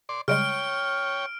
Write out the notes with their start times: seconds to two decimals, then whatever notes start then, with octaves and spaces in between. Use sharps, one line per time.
0.09 D5 C6
0.28 C#3 G3 G#3 C#5 G5 F6 D7